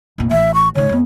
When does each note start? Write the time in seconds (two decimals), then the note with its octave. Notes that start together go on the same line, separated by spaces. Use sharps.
0.18 F1 A#2
0.31 A1 E5
0.54 C#6
0.75 G#2 C#3 C#5
0.89 F2 B3